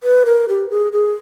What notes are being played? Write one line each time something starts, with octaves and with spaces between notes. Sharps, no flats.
B4
A#4
G4
G#4
G#4